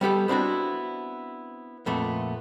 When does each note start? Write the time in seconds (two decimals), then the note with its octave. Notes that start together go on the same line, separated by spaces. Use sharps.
0.01 G3 B3 G4 A4
0.28 B3 C4 D4 E4 F#4
1.86 F2 A#2 A3 B3